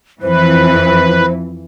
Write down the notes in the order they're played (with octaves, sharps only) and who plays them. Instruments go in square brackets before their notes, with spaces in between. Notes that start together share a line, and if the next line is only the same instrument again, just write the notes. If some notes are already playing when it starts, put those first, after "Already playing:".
[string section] F2 E3 [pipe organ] B4 [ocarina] C5